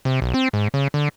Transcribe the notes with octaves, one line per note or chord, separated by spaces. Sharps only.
C3
B1
C4
G#2
C#3
D3